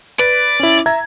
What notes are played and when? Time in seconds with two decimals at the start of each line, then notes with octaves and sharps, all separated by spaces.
0.19 B4 D5
0.60 C#4 E4
0.86 E5 A#5 G#6